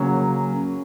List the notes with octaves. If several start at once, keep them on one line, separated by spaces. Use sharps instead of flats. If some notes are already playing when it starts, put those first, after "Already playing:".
Already playing: C#3 F#3 A#3 C#4